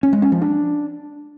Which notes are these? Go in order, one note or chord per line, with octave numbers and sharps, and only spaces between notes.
C#4
G#3
C#4
F3
D4